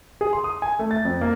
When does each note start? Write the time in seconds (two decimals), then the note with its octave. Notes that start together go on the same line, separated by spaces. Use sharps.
0.21 G#4
0.33 C6
0.44 D#6
0.62 G#5
0.79 A3
0.91 A6
1.05 F2
1.21 A#3